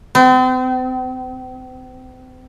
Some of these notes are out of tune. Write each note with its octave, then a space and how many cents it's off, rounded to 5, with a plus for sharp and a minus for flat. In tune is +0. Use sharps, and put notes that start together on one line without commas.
C4 -40